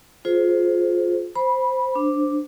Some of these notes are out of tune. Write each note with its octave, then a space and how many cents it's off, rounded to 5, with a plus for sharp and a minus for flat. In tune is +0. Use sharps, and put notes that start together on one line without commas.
F4 +15 G#4 +30 C5 +0
C5 +0 B5 -15
D4 +0 C5 +0